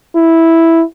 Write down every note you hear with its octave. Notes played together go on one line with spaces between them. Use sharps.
E4